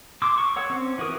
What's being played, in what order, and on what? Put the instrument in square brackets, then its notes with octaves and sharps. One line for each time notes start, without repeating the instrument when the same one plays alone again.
[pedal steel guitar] C6 D6 E6
C#6
C#5 F#5 E6
C4 C#4
E3 F#4 A#4 D#6